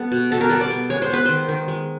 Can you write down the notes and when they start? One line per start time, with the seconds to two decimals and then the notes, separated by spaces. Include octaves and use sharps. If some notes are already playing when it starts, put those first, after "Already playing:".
Already playing: G3 B3 A4
0.12 B2
0.32 B2 A4
0.41 A#4
0.50 G3 A4
0.61 D5
0.70 B3
0.90 G#3 C#5
1.02 C5
1.10 B3 B4
1.25 D#3 C5
1.48 D#3
1.68 G#3